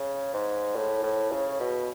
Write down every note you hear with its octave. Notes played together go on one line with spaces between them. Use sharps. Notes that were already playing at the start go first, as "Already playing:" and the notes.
Already playing: C#3
G#2
A2
A2
C#3
B2